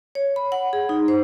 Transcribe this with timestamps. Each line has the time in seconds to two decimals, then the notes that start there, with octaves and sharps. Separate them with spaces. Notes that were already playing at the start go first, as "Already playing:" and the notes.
0.15 C#5
0.36 B5
0.52 F#5
0.73 G#4
0.89 D#4
1.08 C5